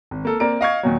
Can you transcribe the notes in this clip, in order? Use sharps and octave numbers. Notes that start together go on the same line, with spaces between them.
G#1
A#3 A4
A#3 C4 A#4 D5 D7
D#5 F5 C#6 G#6
D#2 A#2 F#3